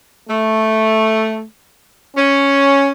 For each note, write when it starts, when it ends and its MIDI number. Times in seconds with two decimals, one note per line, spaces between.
0.29 1.44 57
2.16 2.92 61